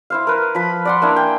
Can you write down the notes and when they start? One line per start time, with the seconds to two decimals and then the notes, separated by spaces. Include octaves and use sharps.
0.10 E4 C5 F5
0.27 A#4 B4
0.55 F3 B5
0.85 D5 F#5 C6
1.02 A#3 D4 E4
1.16 G5 G#5